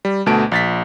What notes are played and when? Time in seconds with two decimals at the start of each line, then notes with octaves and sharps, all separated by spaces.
0.05 G3
0.26 D2 B2 A3 A5 D7
0.52 A#1 A6 B6